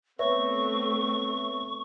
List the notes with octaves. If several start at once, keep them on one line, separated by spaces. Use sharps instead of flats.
A3 B3 C4 B4 C#5 E5 C#6